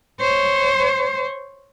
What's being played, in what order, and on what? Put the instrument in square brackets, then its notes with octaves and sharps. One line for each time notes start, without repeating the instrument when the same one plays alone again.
[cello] C5 C#5